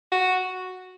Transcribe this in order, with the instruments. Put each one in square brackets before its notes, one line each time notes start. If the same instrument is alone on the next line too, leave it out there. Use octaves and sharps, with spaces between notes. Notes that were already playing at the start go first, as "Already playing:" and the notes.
[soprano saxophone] F#4